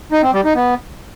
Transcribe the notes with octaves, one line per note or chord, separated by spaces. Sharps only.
D#4
C4
G3
D#4
B3